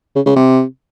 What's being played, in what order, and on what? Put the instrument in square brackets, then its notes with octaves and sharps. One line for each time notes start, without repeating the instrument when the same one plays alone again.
[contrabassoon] C#3
C#3
C3